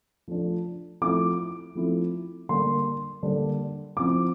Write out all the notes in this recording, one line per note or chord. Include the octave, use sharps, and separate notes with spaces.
F3 A3 D4
F3 A3 C4 E4 D6
F3 A3 C4 E4
D3 G3 A#3 D4 C6
D3 G3 A#3 D4
F3 C4 E4 D6